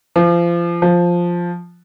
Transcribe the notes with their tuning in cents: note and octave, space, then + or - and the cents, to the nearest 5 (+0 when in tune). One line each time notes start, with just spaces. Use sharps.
F3 -30
F3 +0